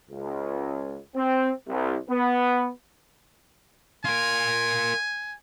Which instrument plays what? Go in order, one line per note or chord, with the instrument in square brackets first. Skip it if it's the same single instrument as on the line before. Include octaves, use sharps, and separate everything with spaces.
[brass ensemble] C#2
C4
C2
B3
[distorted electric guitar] F4 A#4 [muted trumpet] G#5